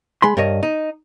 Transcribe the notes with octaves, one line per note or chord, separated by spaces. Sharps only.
G#3 B5 C6
G2 A#4 C#5 D#5
D#4